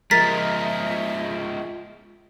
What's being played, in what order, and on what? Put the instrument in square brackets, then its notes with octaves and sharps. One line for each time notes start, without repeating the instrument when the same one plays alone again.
[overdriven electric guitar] F3 G#3 [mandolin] A#4 [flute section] D#5 E5 [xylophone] A6 B6